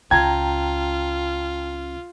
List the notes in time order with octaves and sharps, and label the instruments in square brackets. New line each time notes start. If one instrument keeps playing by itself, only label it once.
[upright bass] C#2 C#3 [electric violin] F4 [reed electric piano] G5 A5 A#5 [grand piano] G#6